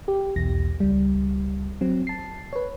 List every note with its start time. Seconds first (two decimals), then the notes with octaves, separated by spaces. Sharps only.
0.08 G4
0.36 B1 E2 A#6
0.80 C#2 G3
1.81 F#3 C4
2.07 A5 C7
2.53 B4 C#5